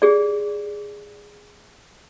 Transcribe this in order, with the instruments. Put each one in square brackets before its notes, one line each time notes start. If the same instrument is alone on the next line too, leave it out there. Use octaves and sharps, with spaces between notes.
[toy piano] G4 G#4 D5